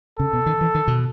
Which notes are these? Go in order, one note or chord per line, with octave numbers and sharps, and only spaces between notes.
C#3 A4
B2
D#3
E3
D#3
B2